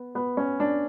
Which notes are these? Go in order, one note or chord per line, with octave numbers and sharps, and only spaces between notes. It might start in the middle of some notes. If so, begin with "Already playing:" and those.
Already playing: B3
B3
C#4
D4